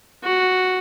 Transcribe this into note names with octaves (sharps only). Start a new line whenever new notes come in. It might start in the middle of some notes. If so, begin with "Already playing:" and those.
F#4